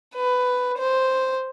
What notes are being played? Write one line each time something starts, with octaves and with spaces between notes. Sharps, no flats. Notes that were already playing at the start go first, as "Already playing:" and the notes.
B4
C5